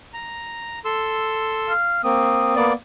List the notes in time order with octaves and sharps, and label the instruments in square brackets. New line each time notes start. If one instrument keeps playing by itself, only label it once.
[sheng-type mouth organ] A#5
A4 C6 E6
[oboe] F5
[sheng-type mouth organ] A#3 C4 [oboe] D#6
[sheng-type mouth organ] A#3 B3 D5